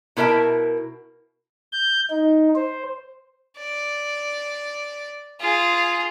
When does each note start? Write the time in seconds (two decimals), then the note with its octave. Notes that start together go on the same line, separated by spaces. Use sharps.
0.17 B2 E4 A#4 E5 A5
1.73 G6
2.10 D#4
2.56 C5
3.58 D5
5.40 F4 G#4